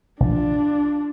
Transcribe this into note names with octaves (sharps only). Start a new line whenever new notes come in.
A#1 D4 F4